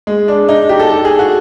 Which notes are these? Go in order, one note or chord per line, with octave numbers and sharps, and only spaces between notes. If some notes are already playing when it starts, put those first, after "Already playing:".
G#3
D4
D#4
G4
A4
A4
G#4
F#4